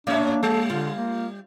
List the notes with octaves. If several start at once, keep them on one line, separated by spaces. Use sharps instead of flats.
A#2 A#3 C#4 D4 C#5 E5
G3 A4
D3 F4
A#3